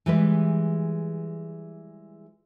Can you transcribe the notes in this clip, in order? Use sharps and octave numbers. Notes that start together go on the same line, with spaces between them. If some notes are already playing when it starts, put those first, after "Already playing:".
E3 G3 G#3 B4